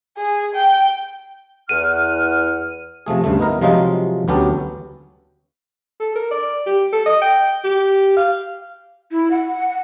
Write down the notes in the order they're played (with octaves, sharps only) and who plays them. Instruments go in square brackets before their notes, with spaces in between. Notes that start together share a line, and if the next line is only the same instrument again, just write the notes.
[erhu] G#4
G5
[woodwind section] E2 F#5 F6 [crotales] D#7
[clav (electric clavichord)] C3 F3 A3 G#4
D2 G2 C#3 G3 A3
B3 D#4 E4 A#4
C3 F3 F#3 G#3 D#4 F4
D2 F#3 B3 C#4 G4 A4
[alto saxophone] A4
A#4
D5
G4
A4
D#5
G5
G4
F5
[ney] E4
F#5
F#5